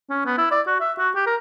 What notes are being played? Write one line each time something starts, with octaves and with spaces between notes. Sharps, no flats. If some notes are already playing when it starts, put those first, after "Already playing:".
C#4
B3
E4
D5
F#4
E5
F#4
G4
A#4